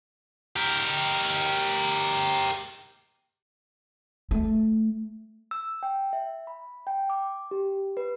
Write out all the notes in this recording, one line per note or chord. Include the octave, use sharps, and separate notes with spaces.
G4 A#4
A3
E6
G5
E5
B5
G5
D6
G4
B4